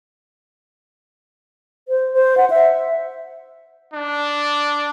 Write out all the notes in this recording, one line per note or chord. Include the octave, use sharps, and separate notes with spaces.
C5
C5
F#5
E5
D4